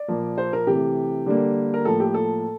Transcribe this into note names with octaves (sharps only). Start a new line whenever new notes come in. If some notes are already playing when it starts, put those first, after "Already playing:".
Already playing: D5
A#2 F3 A#3
C5
A#4
C3 E3 A3 G4
D3 G3 A#3
A#4
A2 F3 A#3 A4
G4
A4